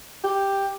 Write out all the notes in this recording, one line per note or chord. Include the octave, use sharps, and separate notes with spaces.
G4